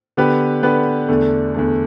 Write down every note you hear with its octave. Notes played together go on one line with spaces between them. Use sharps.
D3 B3 G4 B4
D3 B3 G4 B4
E2 D3 A3
E2 D3 A3